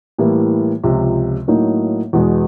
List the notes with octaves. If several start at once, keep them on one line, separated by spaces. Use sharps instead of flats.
A2 E3 G3 A#3
C#2 C3 F3
A2 F#3 A#3 D#4
E2 B2 G#3